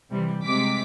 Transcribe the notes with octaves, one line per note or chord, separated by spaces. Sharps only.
C3 E3 G3
C3 G#3 D6 B6